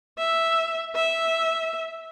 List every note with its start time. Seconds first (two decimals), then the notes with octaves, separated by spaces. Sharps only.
0.18 E5
0.95 E5